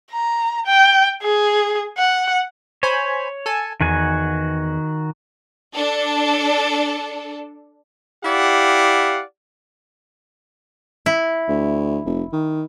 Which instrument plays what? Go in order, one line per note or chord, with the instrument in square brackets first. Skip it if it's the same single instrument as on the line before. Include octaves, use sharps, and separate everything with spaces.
[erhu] A#5
G5
G#4
F#5
[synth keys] C5 G#5 B5 [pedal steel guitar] C#5
[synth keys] A4 G#5 A5
[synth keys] E2 [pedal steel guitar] D#3 F#4 G#5
[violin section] D4 A4
[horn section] E4 G4 D5 F5 F#5
[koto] E4
[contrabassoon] D2
F1
D#3